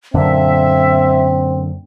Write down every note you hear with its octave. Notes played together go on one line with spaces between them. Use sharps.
F#2 A#2 D3 C4 E5